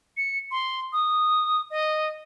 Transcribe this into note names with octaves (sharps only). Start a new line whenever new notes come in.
C#7
C6
D#6
D#5